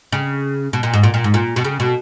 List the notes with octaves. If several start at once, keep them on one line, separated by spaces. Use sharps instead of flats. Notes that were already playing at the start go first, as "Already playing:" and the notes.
C#3
B2
A#2
G#2
A#2
A#2
G#2
A#2
B2
C#3
B2